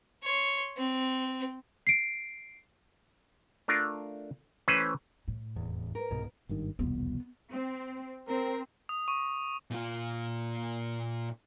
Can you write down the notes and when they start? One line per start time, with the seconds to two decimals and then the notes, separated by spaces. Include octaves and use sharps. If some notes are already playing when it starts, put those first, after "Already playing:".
0.23 C#5 C6
0.77 C4
1.87 C7 D7
3.68 A3 D4 F4 A#4
4.68 E3 A3 C#4 B4 C5
5.28 A2
5.56 F1 E2
5.95 A#4
6.10 C2 G#2 B2
6.49 G#1 G2 D#3
6.79 E1 C2 F2 B3
7.51 C4
8.29 C4 A#4
8.89 D#6
9.08 C#6
9.71 A#2 F4